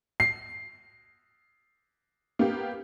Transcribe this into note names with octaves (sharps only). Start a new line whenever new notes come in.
C7
A#3 B3 G4